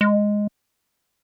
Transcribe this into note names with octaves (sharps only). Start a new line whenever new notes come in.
G#3